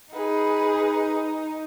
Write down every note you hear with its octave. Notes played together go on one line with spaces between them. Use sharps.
D#4 G#4 B4